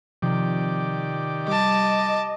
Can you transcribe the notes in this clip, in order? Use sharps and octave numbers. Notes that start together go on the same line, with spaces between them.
C3 D#3 F3 G4 D5
G3 D#5 A5 D6